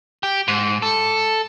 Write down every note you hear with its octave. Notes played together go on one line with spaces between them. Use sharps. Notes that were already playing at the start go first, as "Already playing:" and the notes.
G4
G#2
A4